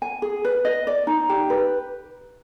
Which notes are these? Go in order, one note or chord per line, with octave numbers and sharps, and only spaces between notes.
G#5
G#4
B4
D#5
D5
D#4
G4
B4